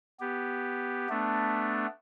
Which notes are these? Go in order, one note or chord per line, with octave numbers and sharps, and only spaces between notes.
B3 G4
A3 B3 D4